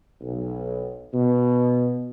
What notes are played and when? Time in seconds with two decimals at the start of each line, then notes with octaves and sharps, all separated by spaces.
0.21 B1
1.14 B2